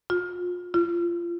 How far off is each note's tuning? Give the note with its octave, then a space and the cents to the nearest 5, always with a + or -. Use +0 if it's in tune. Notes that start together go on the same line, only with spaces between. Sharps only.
F4 +35
F4 -25